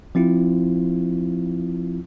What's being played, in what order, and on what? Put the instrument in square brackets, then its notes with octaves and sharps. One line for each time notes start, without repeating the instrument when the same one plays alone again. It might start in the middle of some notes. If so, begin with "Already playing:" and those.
[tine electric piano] F3 C4 E4 F4